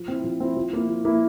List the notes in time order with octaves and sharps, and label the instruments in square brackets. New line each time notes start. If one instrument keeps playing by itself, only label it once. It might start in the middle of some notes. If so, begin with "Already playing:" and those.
Already playing: [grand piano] F3
C4 E4
F3
C4 E4
F3
A#3 E4
F3
A#3 E4